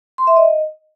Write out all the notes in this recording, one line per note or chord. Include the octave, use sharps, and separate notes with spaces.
C6
E5
D#5